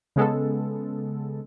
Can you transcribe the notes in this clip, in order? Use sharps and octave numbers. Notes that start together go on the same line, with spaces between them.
C#3 G#3 B3 A4